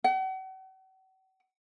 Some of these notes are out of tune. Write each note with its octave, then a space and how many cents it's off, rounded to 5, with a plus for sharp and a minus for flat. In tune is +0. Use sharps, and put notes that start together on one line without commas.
F#5 +40